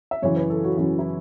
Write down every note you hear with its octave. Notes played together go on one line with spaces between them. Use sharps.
E5
F#2 C#3 E3 C#5
B4
A4
F#4
F#2 C#3 E3 F#4
E4